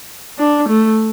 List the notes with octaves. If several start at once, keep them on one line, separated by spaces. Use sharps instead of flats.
D4
A3